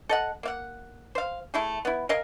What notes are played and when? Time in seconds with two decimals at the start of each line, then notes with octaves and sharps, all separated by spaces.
0.09 A4 D#5 F#5
0.43 A#3 F5 F#5
1.15 C5 F5
1.54 A3 E4 G#4
1.85 B3 E4
2.09 A#4 D#5 F5 G#5